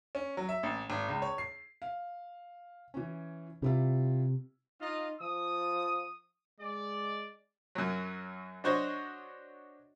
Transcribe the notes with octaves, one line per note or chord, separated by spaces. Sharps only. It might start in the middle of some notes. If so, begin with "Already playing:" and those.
C#4
F#3
E5
A1
G#1
C#2
C#5
C7
F5
E3 C#4
C3 G3 E4 F4
D#4 F4 D#5 F5
F3 D#6
G#3 D5
F#2 F#3
D4 F#4 C5 C#5 D#5